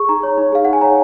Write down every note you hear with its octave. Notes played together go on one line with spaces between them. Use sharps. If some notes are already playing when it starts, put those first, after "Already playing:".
Already playing: G#4 C#6
D#4 A#5
C#5
D#4
G#4 F5
D#4 F#5
G#5
C#5 A#5